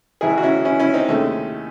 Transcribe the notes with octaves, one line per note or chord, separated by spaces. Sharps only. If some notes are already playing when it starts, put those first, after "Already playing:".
A1 G#2 D#3 G#3 E4 G#4
F#4
C#4 E4
C#4 E4
C#4 E4
C4 D#4
D#2 D#3 G#3 A3 C#4